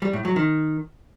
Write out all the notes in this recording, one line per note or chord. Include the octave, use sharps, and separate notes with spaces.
G3
A2
F#3
D#3